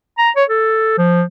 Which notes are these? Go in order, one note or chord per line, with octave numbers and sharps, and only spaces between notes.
A#5
C#5
A4
F3